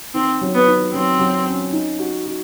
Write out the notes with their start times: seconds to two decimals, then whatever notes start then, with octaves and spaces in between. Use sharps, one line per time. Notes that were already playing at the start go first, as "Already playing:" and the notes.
0.14 D#3 C4
0.41 F#3
0.54 B3
0.67 D#3
0.93 F#3 C4
1.19 F#3
1.46 C#4
1.73 D#4
1.99 F#4
2.26 F#4